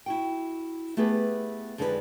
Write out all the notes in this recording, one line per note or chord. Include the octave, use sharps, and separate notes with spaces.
E4 F#4 G5
A3 B3 G4 G#4 B4
F2 D3 G#3 D#4 E4 B4